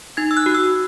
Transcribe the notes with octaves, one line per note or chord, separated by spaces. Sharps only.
D#4 G#6
E6
F#6
F#4
E6